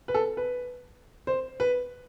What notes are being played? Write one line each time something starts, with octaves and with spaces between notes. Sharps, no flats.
B4
A4
B4
C5
B4